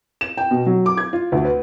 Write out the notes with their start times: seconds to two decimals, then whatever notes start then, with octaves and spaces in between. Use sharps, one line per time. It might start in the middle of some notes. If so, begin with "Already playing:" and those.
0.21 E7
0.37 G5
0.51 B2
0.66 F#3
0.86 D6
0.98 G#6
1.13 F4
1.32 D2
1.45 B4